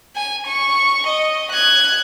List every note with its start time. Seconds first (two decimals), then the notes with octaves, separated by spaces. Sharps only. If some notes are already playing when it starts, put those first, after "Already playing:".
0.16 G#5
0.47 C#6
1.07 D#5
1.52 F#6 G#6